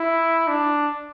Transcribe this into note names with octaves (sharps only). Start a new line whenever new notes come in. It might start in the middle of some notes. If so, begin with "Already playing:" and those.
Already playing: E4
D4